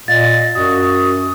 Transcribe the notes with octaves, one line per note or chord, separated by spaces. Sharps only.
A#2 D#5 F5 A6
F#2 F#4 D#6